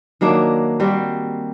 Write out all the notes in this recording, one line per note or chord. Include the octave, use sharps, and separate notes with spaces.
D#3 F#3 A#3 D4
G3 A#3 C4 F#4